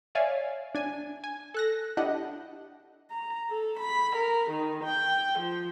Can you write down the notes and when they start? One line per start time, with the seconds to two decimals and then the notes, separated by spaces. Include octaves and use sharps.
0.15 C#5 D5 E5 F5 G#5
0.75 D4 G#5
1.24 G#5
1.54 A4 F#6 A#6
1.97 D4 E4 G4 D#5 F#5
3.10 A#5
3.49 A4
3.79 B5
4.16 A#4
4.51 D#3
4.84 G5
5.39 F3